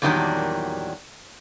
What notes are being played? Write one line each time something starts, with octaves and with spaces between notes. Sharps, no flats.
E2 A#2 D#3 F#3 G3 D4